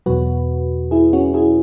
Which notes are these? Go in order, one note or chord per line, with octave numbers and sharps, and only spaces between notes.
E2 B2 F#3 F#4 B4
E4 G#4
C#4 F#4
E4 G#4